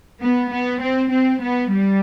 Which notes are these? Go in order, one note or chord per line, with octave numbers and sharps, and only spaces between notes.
B3
B3
C4
C4
B3
G3